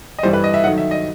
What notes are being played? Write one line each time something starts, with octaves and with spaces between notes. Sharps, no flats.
D#5
G2 E3 G3 C5
B4
D#5
E5
D#3 F#3 A3 D#4 F#5
E5
D#5